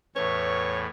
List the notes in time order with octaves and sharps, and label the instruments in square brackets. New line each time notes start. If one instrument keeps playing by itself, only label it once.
[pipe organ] E2 A2 [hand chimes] B4 C#6 [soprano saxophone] C#5